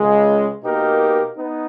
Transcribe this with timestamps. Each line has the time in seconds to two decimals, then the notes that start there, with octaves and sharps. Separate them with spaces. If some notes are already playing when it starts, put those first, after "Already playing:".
Already playing: C#2 C#3 G#3
0.62 B2 A#3 D#4 G4 A#4
1.37 B3 D#4